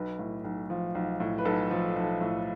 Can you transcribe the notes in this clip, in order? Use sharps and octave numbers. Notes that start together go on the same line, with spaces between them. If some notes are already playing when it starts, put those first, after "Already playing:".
Already playing: B1 B4
A2
B1
F3
B1
A2
B4
B1 A4
F3
B1
A2